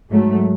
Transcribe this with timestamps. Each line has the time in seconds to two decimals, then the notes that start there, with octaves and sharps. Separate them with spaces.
0.10 G#2 F#3 A3